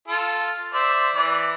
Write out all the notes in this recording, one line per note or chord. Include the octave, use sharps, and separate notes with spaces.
F4 A4
C5 D5 E5
E3 D5